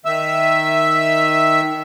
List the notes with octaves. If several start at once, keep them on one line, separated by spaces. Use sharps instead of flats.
D#3 E5 E6